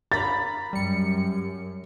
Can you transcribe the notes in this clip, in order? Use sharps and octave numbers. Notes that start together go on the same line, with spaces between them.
A#5 B5 A6
F#2 G3 C#7